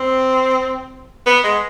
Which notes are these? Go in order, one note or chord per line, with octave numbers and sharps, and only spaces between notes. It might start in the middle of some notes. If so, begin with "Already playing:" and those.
Already playing: C4
B3
G#3